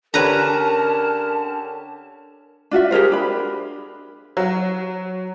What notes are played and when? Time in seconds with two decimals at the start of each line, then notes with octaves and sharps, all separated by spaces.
0.14 D3 C#4 G4 A#4 B4 A5 A#5
2.71 D4 F4 F#4 E5
2.91 G4 G#4 A#4 C5
3.12 D4 B5
4.37 F#3